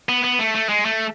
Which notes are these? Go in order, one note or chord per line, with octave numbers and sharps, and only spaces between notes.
B3
B3
A3
A3
G#3
A3